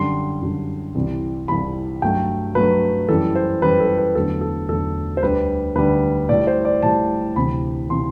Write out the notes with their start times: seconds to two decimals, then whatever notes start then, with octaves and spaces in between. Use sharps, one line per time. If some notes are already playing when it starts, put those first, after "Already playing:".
Already playing: F#2 D3 G3 C6
0.41 F#2 D3 G3
0.95 C2 C3 E3 G3
1.48 C2 C3 E3 G3 B5
2.02 G2 F#3 A3 G5
2.55 G2 F#3 A3 B4
3.09 F#2 E3 G3 A4
3.35 C5
3.62 F#2 E3 G3 B4
3.80 A4
3.98 B4
4.15 E2 D3 F#3 A3 A4
4.41 A4
4.69 E2 D3 F#3 A3 A4
5.17 C5
5.23 D2 D3 G3 B4
5.75 D2 D3 G3 B4
6.29 A2 G3 D5
6.47 C5
6.65 D5
6.82 A2 G3 A5
7.36 D2 C3 E3 B5
7.89 C3 E3 C6